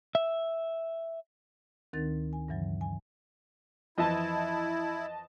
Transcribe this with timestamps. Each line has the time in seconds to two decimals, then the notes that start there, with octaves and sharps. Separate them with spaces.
0.15 E5
1.93 D2 D#3 C4 D#4 A#4 A6
2.33 G#5
2.48 G2 C#3 E3 F#3
2.81 G#5
3.98 F2 E3 E4 D#5 E5 A5